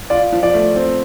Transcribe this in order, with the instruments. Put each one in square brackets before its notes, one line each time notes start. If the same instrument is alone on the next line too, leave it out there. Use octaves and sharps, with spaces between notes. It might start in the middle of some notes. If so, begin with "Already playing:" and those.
[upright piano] F4 [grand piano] D5
[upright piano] F3
[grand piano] D5
[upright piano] A3
C4